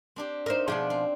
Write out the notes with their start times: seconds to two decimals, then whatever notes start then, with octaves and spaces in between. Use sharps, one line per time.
0.16 C4 D4 G4
0.46 D#4 A#4 C5 E5
0.68 B2 F3 B3 D4 G#4 G5
0.90 C4